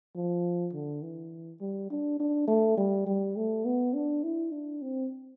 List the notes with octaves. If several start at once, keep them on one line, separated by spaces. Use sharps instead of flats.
F3
D3
E3
G3
D4
D4
A3
G3
G3
A3
B3
D4
E4
D4
C4